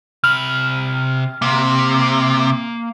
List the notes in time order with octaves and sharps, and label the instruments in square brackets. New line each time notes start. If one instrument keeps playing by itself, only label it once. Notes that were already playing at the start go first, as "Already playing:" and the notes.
[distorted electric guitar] C3 B5 [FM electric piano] F6
[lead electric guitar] C3 [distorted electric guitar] A#3